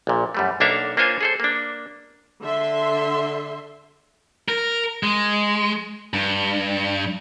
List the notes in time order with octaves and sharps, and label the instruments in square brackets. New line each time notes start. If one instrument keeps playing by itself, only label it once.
[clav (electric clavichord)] A#1 A#2
F#2 G3 A3
B1 A#3 D4 A4 E5 F5
A#3 D4 F4 C5 C#5 G#5
G#4 A4 C5
A#3 D4
[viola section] D3 E5 C6
[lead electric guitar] A#4
G#3
G2